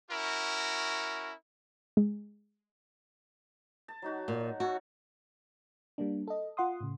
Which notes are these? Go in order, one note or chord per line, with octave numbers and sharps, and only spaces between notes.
C#4 E4 F#4 A#4
G#3
A5
F#3 D#4 F#4
A#2
F#4 A4 C#5
G3 A#3 D4
A4 D#5
F4 F#5 C6 D#6
A2 C#3